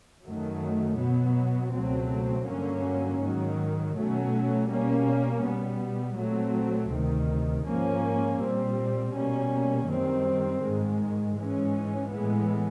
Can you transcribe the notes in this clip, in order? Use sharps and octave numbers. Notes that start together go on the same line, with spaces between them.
F#2 D#3 F#3 A3
B2 F#3 B3
C#2 B2 F#3 A3 C4
G2 D3 F#3 A#3 C#4
G#2 D#3 F#3
B2 F#3 A3 C#4
B2 G3 A#3 C#4
B2 G3 B3
A#2 F#3 A3 C4
D2 C3 D#3
G#2 F3 A#3 C#4
A#2 G3 C4
B2 G3 A#3 C#4
F#2 D#3 G3 C4
G#2 D#3 G#3
G#2 E3 G#3 C#4
A2 E3 G#3 B3